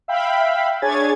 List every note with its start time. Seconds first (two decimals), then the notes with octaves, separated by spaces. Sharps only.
0.08 E5 F5 G5 B5
0.82 D4 G#4 C#5 G#5 G#6 A6